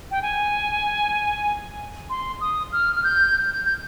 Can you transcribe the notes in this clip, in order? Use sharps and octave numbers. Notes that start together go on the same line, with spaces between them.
G5
G#5
C6
D#6
F6
F6
G6
G6
G6